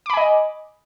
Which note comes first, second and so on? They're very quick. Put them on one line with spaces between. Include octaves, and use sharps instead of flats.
D6 B5 G#5 D#5